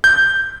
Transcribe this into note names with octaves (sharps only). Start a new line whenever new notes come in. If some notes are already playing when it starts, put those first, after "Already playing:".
G6